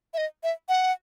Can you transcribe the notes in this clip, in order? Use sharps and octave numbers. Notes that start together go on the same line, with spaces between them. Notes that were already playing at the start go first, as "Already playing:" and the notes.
E5
D#5
E5
F#5